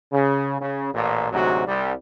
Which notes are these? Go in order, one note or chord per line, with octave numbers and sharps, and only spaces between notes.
C#3
C#3
A1 A#2
D2 G#2 C3 F#3 F#4
C2 G3